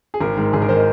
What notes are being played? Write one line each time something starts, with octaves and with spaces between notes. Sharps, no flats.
G#4
G#1 A#4
G#2 D#3
G#1 G#4
A#4
D#3 C5
D#5